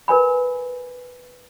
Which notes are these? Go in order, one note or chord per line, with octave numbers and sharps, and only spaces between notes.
A#4 B4 G#5 B5